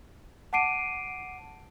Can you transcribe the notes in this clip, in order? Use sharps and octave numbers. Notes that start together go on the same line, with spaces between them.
F#5 A5 D6 C7 D7 D#7